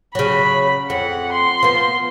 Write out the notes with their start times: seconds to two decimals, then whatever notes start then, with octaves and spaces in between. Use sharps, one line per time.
0.15 C#3 F#3 B5
0.90 F2 F#5
1.32 C6
1.63 F3 B3